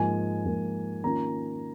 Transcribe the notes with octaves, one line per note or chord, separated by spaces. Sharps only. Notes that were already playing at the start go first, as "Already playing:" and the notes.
Already playing: G#2 F3 A#3 G#5
G#2 F3 A#3
D#3 A#3 C#4 F4 A#5